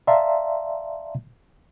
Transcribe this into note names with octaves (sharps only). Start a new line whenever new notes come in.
D5 E5 F5 A5 A#5 C6